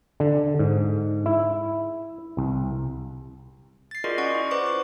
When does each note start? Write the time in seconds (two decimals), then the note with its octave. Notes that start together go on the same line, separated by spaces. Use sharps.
0.20 D3
0.59 G#2
1.26 E4
2.37 C2
3.91 A6 C7
4.04 F4 F#4 G#4 A#4 D5 D#5
4.18 C#4 F4 D5 F#5 C#6
4.35 E4
4.51 B4 C5 D5 C#6 D6
4.67 D6